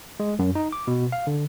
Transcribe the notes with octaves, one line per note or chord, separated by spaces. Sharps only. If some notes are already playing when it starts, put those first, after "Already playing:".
G#3
F#2
D#4
D6
B2
F5
D3